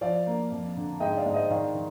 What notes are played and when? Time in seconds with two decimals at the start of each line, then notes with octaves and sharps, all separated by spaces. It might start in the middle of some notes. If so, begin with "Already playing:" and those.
0.01 F3 D5 F5
0.27 A#3
0.51 F2
0.77 D3
1.00 G#2 D#5 G5
1.17 D5 F5
1.26 G#2
1.34 C5 D#5
1.50 D#3 D5 F5
1.75 D#3